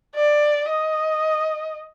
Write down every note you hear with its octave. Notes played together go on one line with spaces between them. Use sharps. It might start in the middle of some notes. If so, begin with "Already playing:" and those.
D5
D#5